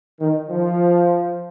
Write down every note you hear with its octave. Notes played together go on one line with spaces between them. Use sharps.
D#3
F3